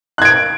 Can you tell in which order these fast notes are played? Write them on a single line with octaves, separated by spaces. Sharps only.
F#6 G#6 D7